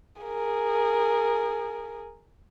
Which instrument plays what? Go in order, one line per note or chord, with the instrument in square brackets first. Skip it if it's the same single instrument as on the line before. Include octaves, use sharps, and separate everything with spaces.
[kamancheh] G#4 A#4